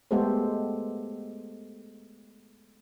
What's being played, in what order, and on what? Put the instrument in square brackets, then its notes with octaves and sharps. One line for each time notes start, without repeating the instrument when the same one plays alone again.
[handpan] G#3 A3 B3 G4 A4 C5